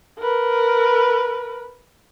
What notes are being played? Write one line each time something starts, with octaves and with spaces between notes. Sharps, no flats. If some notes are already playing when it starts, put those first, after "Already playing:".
A#4 B4